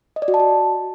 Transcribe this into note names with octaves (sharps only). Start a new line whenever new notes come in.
D#5
D5
F#4
A5
F#4